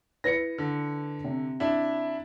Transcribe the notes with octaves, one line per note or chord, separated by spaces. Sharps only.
E4 B4 A#6 C#7
D3
C3
D4 E4